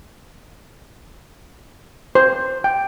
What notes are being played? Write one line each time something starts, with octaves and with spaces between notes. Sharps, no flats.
C5
G5